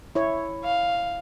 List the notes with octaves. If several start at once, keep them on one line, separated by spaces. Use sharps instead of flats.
E4 C#5
F5